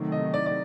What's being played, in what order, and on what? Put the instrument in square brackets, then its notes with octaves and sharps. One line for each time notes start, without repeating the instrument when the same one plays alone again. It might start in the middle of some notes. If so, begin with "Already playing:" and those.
Already playing: [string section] C3 D#3 F#3 A3
[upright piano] D#5
D5
D5